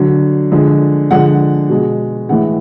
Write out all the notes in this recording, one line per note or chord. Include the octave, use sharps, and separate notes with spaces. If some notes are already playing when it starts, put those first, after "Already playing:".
Already playing: D3 F#3
D3 F3 G#3
D3 F3 G#3 F#5
B2 G#3
A2 E3 G#3 F#5